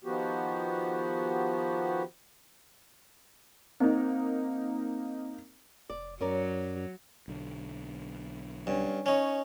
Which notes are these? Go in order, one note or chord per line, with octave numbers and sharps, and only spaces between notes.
D#3 F3 B3 F#4 G4
A#3 C4 D#4
F1 D5
F#2 F#3 C#4 A#4 D5
B1 D3
G2 C#4
C#4 D#4 C#5